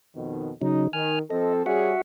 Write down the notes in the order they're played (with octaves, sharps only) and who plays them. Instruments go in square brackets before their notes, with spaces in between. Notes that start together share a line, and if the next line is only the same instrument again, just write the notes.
[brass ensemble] F2 B2 D#3
[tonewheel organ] C#3 F#3 [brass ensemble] D#4
[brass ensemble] D#3 [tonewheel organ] G#5 F6
[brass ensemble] F3 C4 A4 [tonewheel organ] D#5
[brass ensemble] G3 C#4 G#4 [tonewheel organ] F#4 E5 F#5